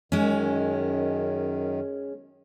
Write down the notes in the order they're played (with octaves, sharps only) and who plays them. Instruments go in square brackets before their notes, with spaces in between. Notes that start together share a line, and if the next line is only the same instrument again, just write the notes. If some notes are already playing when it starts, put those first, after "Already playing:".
[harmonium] F#2 D#3 [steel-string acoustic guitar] G#3 C#4